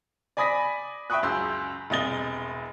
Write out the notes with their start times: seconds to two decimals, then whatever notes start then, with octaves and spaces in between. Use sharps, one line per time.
0.37 D5 G#5 B5 D#6 A#6 B6
1.10 E5 G5 B5 C#6 D#6 F#6
1.23 C#2 F#2 C6 E6 G6
1.90 E1 C2 D#5 A6 G7